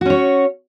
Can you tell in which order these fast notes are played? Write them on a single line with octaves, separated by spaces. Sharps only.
F#4 C#4 C#5